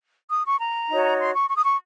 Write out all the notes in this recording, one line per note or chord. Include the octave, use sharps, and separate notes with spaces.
D#6
C#6
A#5
D#4 F#4 C#5
C6
C#6
C#6
D#6
C#6